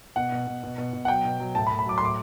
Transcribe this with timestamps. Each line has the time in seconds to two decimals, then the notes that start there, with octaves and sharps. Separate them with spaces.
0.16 B2 F#5
0.32 B2
0.47 B2
0.63 B2
0.78 B2
0.93 B2
1.05 F#5
1.08 F#3 G5
1.25 B2
1.40 F#3
1.55 A2 A5
1.67 B5
1.71 A2
1.79 B5
1.86 F#3 D6
1.98 C6
2.01 A2 D6